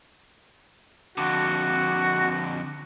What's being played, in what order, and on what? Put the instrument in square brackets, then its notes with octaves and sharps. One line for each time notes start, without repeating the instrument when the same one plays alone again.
[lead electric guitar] F2 D3 [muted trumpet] F#4